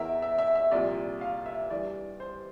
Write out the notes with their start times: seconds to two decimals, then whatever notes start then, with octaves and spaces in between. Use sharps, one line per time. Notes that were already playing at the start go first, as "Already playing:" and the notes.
Already playing: E2 E3 A#4 E5
0.22 E5
0.38 E5
0.55 E5
0.71 C2 A#2 F3 D5
1.21 F5
1.46 E5
1.70 G2 E3 D5
2.20 C5